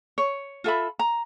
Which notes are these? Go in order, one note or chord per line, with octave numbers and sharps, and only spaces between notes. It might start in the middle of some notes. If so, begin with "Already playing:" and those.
C#5
F4 A4 E5 B5
A#5